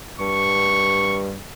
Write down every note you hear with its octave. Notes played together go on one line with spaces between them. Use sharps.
G2 C#6